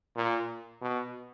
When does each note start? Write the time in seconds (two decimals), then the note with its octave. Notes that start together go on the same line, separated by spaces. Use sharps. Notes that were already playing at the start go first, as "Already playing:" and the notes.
0.16 A#2
0.81 B2